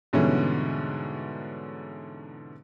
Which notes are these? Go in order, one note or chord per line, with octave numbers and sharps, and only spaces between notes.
G#2 B2 D3 E3 G3 C#4